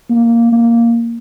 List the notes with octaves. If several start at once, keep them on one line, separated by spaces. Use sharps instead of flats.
A#3
A#3